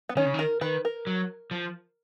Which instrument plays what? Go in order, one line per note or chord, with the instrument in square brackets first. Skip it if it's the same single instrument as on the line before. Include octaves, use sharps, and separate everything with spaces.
[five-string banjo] B3
[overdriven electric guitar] D#3 [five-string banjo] C#4
[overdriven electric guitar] C#3
D#3
[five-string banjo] A#4
[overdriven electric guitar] D#3 [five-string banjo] B4
[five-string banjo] A#4
[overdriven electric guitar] F#3
F3